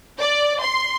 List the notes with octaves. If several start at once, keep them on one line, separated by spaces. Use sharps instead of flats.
D5
C6